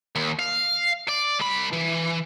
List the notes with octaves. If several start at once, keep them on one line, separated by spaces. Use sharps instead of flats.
D#2
F5
D5
C2 B5
E3